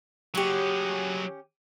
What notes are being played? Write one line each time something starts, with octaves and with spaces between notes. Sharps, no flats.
F#3 C#4 G4 G#4